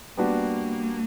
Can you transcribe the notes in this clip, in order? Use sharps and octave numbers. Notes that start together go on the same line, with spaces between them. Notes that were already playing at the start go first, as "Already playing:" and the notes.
G3 A#3 B3 D4 F#4 B4